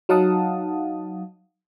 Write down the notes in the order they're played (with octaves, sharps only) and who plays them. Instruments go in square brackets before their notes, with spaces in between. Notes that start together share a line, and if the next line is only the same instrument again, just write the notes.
[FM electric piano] F#3 D#4 F5 F#5 A5 D#6